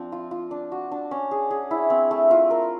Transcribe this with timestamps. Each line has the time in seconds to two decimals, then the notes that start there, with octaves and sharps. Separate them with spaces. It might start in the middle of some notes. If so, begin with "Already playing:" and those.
Already playing: F3 C4 D4
0.12 F4
0.31 F4
0.51 D4
0.72 F#4
0.92 D4
1.11 C#4
1.31 G#4
1.51 G#4
1.71 E4
1.90 C4
2.11 A3
2.31 F4
2.51 A#4